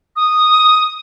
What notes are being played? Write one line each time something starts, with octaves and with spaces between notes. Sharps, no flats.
D#6